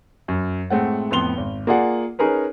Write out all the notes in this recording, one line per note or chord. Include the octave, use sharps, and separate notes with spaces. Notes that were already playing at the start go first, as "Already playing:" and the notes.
F#2
A2 G#3 A3 C4 F#5
F2 A2 B3 C6 F7 G7
G#1
A#3 F4 G#4 D5 F#5
C#4 D#4 G#4 A#4 B4